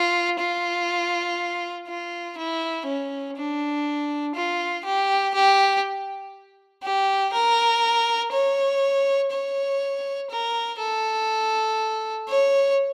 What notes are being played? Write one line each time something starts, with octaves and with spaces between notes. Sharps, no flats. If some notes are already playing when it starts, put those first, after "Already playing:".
Already playing: F4
F4
F4
E4
C#4
D4
F4
G4
G4
G4
A#4
C#5
C#5
A#4
A4
C#5